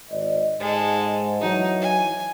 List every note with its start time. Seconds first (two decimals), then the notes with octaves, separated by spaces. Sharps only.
0.10 G#1 D5 D#5
0.60 G#2 G#3 A4
1.41 E3 F#3 D#4
1.81 G#5